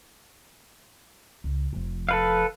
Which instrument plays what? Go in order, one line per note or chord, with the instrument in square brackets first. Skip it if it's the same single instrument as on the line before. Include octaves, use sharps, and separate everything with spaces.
[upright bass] C#2
F1 F3
[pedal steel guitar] A4 B4 F5